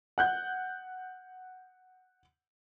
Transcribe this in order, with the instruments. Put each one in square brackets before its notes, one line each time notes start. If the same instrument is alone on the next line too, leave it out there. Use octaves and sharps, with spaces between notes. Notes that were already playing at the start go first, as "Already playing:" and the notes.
[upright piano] F#5 F#6 G6